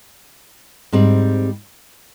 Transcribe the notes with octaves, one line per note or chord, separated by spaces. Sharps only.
G#2 G3 C4